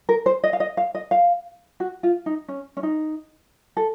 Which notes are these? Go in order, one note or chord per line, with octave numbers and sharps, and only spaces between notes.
A#4
C5
D#5
F5
D#5
F5
D#5
F5
F#4
F4
D#4
C#4
C#4
D#4
A4